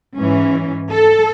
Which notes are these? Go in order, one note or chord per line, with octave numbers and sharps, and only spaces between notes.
G#2 E3 C#4
A4